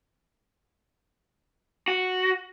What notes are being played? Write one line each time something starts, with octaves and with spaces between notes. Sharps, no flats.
F#4